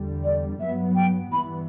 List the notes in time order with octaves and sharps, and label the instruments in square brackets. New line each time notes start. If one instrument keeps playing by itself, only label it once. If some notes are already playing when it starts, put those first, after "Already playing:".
Already playing: [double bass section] E2 D3 G3
[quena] D5
[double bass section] G2 F#3 B3 [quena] E5
[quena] G5
[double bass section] G2 E3 B3 [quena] B5